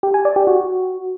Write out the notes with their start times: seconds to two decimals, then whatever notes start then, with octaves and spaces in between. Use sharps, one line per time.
0.03 G4
0.14 G#5
0.25 D5
0.36 G4
0.47 F#4